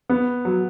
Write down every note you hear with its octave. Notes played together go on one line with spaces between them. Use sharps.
B3
F#3